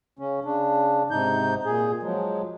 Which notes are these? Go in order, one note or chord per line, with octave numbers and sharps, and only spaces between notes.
C#3 C#4
C#3 D4
G#2 C3 D#4 G6
A#2 G#4
F3 F#3 G#3